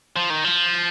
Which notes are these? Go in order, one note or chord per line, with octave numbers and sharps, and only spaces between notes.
F3
D#3
F3